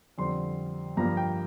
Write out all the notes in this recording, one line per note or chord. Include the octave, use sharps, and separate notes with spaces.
F2 D3 G3 C4 C6
G2 F3 A#3 A#5
G5